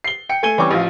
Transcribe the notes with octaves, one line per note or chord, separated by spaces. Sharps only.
C7 G7
G5 C#7
A3 G#5 D#7 G7
E3 G3 C4 C#4 C#6 D6
A1 F3 F5